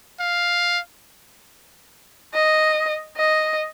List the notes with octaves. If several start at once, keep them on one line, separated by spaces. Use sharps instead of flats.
F5
D#5
D#5